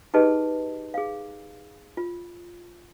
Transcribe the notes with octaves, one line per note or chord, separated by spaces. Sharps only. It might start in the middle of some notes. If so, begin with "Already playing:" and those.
D#4 G4 G#4 B4 D#5 A5
G#4 F5
F4